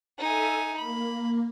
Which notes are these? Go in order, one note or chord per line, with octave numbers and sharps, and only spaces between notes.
D#4 A4 E5 G#5
A#3 B5